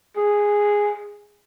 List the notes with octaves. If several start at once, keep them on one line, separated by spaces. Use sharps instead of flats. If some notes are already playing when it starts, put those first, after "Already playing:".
G#4